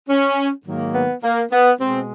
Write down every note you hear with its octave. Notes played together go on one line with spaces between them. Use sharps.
C#4
G#2 D#3 F#3 A#3
B3
A#3
B3
B2 G#3 C4